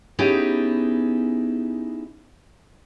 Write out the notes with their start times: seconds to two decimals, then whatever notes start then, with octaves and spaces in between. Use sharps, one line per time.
0.19 B3 C#4 D#4 E4 G4 G#4